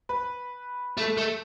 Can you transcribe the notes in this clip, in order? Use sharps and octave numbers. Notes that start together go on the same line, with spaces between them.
B4
A3
A3